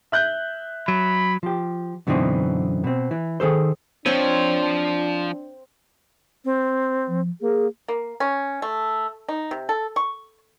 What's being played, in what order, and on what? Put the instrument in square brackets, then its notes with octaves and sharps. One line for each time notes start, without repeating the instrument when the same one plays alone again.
[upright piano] E5 F#6 G6
[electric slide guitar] F#3 [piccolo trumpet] B5
[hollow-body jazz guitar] F3 G4
F#2 B2 D3 E3 C4 D#4
B2 C4
E3
D#3 G#4 A4 C5
[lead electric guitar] F3 C5 [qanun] C4 C#5 [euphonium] D4
[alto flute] C4
[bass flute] F3
[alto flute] A#3 [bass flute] G#4
[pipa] A#3
C#4
A3
D#4
C3
A4
C#6